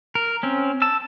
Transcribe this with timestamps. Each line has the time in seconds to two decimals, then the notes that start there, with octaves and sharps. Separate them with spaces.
0.15 A#4
0.43 C4 C#4
0.82 A5 E6